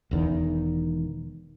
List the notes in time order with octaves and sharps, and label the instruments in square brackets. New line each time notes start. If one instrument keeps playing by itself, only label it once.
[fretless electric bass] E1 E2 D#3